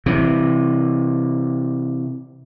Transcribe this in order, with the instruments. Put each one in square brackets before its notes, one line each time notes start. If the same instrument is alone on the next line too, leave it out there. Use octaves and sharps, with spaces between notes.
[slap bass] C3 E3